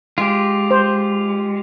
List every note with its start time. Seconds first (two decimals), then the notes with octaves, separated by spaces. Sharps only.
0.18 G#3 F4 G4
0.71 C5